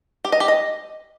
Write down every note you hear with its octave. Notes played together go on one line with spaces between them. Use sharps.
G4
D#5
G4
D#5